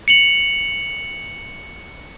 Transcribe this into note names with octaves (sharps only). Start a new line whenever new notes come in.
C#7 F7 F#7